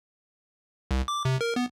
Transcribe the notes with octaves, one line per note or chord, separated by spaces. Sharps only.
C2
D6
C3
A#4
B3